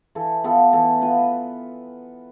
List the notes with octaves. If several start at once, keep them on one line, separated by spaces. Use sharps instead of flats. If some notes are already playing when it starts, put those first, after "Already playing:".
E3 A4
B3 F4 A4
E3 A4
B3 F4 B4